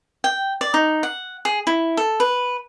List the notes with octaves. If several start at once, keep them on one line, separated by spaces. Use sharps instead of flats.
G5
D5
D#4
F#5
G#4
E4
A4
B4